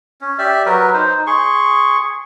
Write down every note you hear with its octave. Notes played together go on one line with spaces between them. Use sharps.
C#4
G4 D5 E5
F#3 A#4 B4
D#4 C5
G#4 C6 C#6